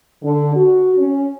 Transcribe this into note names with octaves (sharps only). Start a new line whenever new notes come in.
D3
F#4
C#4